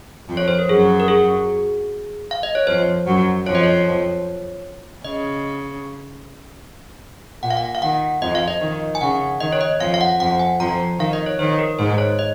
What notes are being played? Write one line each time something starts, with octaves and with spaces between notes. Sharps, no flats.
F2 F3
C#5
C5
A#4
F#2 F#3 G#4
A#4
G#4
F5
D#5
C#5
F2 F3 C5
F#2 F#3
F2 F3 C#5
D#5
C#5
C#3 D#5
A#2 F#5
F5
F#5
F5
D#3 F#5
F2 F3 D#5
F5
D#5
D#3
G#5
C#3 F#5
D#3 D#5
C#5
D#5
F2 F3 F5
F5
F#5
F2 F3 F#5
G#5
F2 F3 A#5
D#3 F5
D#5
C#5
D#3 C5
A#4
G#2 C5
C#5
D#5